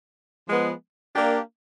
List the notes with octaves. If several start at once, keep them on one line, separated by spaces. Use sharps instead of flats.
F3 G#3 B3
A#3 D4 G4